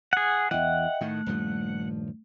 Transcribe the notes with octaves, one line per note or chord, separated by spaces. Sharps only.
G#4 F#5
E2 E3 D#5 E5 F#5 G5
A2 D#3 A3
D#1 G2 F3